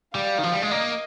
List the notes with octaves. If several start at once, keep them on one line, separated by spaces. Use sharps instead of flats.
G3 F5
D#3
F3
G3
G#3
A#3 D#5